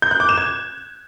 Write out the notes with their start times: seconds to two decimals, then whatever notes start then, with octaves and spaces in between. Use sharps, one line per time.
0.02 G6
0.11 F#6
0.20 D6
0.29 E7
0.38 G#6